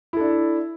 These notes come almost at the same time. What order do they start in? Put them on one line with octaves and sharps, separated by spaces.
E4 A4 D4